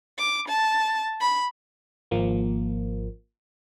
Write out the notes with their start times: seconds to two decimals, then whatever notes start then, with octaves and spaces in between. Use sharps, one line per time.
0.18 D6
0.48 A5
1.21 B5
2.11 G#1 F3 A#3